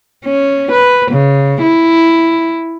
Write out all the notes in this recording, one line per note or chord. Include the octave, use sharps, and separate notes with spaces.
C#4
B4
C#3
E4